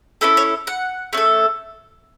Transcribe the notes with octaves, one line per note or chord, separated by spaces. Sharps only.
C#4 E4 A4 B4
C#5
F#5
A3 C#4 A4